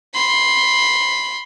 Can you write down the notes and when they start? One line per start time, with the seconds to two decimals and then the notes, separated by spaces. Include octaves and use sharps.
0.14 B5 C6